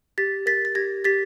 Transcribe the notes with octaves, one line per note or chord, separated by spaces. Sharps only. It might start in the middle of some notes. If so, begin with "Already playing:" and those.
G4 A6 B6
A#4 A6 B6
A6
G4 G#6 A#6
G4 A6 B6